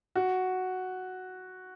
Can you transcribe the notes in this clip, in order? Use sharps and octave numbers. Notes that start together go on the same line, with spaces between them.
F#4